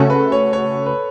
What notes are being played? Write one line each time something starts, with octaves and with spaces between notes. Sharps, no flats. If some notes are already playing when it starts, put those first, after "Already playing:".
Already playing: C#3 A3 C#4 F#4 A4
B4
C#5
C#5
B4